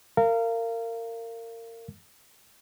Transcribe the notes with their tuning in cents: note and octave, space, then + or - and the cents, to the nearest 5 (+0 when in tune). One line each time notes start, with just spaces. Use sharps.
A#4 -25 F5 -25